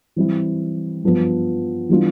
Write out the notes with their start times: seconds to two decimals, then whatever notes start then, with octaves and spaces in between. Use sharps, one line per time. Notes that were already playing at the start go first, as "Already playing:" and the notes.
0.16 E3 G3 C4 E4
1.03 G2 F3 B3
1.89 E3 G3 B3 D4 F4